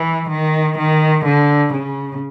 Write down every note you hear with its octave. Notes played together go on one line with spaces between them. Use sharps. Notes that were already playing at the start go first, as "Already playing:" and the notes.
Already playing: E3
D#3
D#3
D3
C#3